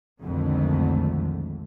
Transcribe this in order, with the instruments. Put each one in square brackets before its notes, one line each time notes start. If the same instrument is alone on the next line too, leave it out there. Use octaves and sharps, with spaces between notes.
[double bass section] B1 F2 D3 D#3 G#3 A3